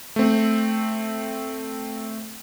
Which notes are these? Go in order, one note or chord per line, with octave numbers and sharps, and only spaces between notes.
A3 C4